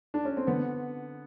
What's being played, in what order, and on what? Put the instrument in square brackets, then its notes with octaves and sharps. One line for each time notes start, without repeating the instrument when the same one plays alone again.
[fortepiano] D4
C#4
C4
D3 B3